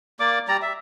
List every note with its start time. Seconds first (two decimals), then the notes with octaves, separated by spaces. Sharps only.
0.20 A#3 D5 D6
0.48 G3 D5 A#5
0.62 E5